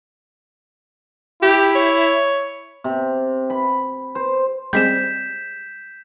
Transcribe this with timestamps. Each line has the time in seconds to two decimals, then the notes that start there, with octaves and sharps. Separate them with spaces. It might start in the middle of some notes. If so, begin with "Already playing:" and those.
1.43 E4 G4
1.76 C#5
2.84 C3
3.50 B5
4.15 C5
4.73 G3 G#3 C4 G6 B6 E7